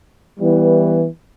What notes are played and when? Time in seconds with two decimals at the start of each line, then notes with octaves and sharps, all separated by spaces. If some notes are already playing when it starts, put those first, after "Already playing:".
0.39 E3 G3 B3 E4 B4